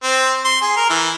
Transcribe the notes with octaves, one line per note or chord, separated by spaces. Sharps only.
C4
C6
G#4
A#4
E3